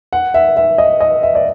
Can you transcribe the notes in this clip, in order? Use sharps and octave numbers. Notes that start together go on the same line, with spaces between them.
F#5
E5
E5
D#5
D#5
E5
D5